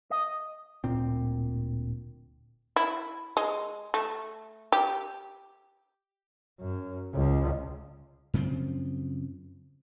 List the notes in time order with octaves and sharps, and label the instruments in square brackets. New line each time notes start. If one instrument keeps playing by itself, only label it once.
[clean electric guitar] D#5
[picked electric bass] D1 A#2 C4
[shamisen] E4
G#3
A3
G4
[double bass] F#2
C#2
[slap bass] F#2 C#3 F3 C4